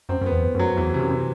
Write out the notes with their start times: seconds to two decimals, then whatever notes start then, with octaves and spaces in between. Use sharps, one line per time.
0.09 F#2 C4
0.21 F#2 B3
0.31 E2
0.55 F#2 F#3
0.77 E2 E3
0.94 C3
1.00 F#2
1.11 C3